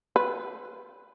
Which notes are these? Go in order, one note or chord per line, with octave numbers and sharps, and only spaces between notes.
B4